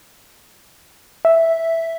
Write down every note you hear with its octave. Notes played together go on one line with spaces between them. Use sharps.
E5